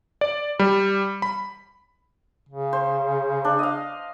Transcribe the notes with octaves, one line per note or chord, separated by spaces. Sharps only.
D5
G3
B5
C#3
C5
D4
D#5 F5